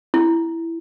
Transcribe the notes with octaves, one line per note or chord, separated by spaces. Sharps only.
E4